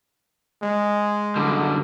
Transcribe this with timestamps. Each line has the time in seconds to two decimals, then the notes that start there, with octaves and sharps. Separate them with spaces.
0.62 G#3
1.36 F#2 D3 G3